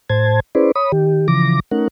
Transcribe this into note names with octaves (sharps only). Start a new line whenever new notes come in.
A2 C5 A5 G#6
C#4 E4 G#4 B4 C5 D5
C#5 B5 D#6
D#3 G4
C#3 E3 F3 D6 A#6
A3 C#4 D#4 A#4 F#5